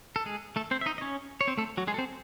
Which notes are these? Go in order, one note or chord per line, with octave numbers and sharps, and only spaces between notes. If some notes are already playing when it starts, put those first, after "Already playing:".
A4
G#3 G#4
A3 A4
C4 C5
E5
D#4 D#5
D#5
C#4 C#5
C#5
C4 C5
A3 A4
F#3 F#4
G#3 G#4
A4
C4 C5